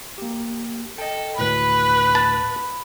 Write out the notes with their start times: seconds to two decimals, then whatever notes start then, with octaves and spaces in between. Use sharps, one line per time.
0.18 A#3 G4
0.98 A4 D#5 G5
1.39 D2 A2 B4 B5
2.15 A5